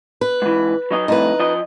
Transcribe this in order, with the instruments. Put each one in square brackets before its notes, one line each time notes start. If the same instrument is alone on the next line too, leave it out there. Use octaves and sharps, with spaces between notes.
[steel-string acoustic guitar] B4
[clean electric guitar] G#2 E3
F#3 D#4 D#5
[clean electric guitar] C2 F2 A2 [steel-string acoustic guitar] D#4 B4
[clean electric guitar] F3 D#5